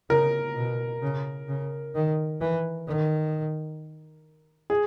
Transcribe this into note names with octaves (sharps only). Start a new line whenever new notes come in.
C#3 A#4
B2
C#3
C#3
D#3
E3
D#3
G#4